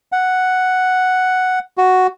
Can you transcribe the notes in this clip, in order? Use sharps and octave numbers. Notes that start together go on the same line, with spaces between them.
F#5
F#4